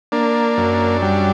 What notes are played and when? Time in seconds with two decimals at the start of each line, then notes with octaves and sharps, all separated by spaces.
0.12 A#3 D4
0.57 F#2
1.02 G3